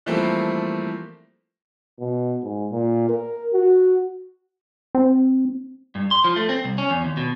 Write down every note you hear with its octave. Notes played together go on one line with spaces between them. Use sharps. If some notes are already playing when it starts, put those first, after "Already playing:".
E3 F3 G3 A3 A#3 C4
B2
G#2
A#2
A#4
F#4
C4
G2
C6
F3
A3
C4
C2
C#4
E2
D#2
B2